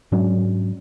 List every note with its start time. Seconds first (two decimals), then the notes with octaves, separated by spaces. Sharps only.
0.12 G#2 F#3 C#4 D4